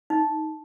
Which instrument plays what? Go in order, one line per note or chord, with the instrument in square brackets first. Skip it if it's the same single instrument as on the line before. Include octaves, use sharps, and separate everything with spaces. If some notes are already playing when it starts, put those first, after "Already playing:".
[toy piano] D#4